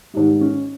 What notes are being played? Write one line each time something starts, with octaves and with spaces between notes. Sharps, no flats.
G#2 D#3 G3 D#4
C#4